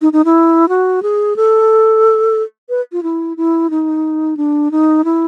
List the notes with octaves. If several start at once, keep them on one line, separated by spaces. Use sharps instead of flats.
D#4
D#4
E4
F#4
G#4
A4
B4
F4
E4
E4
D#4
D4
D#4
E4